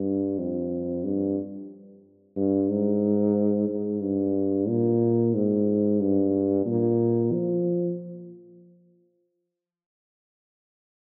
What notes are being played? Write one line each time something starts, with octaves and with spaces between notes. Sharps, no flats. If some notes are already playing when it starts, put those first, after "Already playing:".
Already playing: G2
F2
G2
G2
G#2
G#2
G2
A#2
G#2
G2
A#2
F3